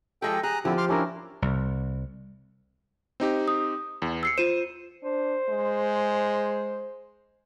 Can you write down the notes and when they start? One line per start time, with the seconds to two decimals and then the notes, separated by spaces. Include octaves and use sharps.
0.22 F3 G#3 G4 A4 G5
0.43 G#4 A#5 F#6
0.65 D3 F3 C4 E4 G4
0.78 C6 D6 F6
0.89 C#4 D4 E4 A#4
1.42 C2
3.20 C4 D#4 G4
3.48 D#6
4.02 E2
4.23 E6 C7 C#7
4.38 F4 C5 D#7 E7
5.03 D4 C5
5.49 G#3